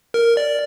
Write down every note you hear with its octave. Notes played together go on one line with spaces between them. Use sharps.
A#4
D5